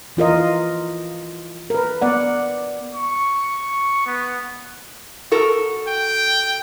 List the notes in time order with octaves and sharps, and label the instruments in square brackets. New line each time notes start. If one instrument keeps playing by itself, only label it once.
[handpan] E3 F4 A#4 D#5
A#4 B4
B3 D5 F#5
[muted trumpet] C#6
B3
[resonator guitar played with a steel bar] F#4 A4 A#4
[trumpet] G5